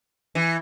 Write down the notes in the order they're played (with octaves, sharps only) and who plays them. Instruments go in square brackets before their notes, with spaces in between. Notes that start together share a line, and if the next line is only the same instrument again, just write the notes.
[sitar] E3